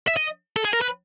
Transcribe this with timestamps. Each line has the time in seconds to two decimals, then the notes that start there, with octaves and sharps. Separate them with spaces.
0.08 E5
0.17 D#5
0.57 A4
0.65 G#4
0.73 A#4
0.81 B4